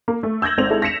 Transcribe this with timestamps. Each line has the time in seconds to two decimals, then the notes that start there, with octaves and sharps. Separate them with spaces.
0.08 A#3
0.23 A3
0.42 E6 G6 G#6 A#6 F#7
0.58 G#1 C4 F7
0.70 G#3 E4 A4
0.82 A#6 B6 C#7 E7 F7